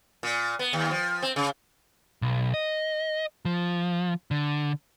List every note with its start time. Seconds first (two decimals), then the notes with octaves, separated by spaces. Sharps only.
0.23 A#2
0.59 B3
0.73 D#2
0.91 F3
1.22 C4
1.36 C#3
2.22 B1
2.54 D#5
3.45 F3
4.31 D3